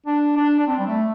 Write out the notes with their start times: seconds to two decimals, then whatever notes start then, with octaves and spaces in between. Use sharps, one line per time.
0.06 D4
0.37 D4
0.59 D4
0.67 C4
0.79 G3
0.87 A3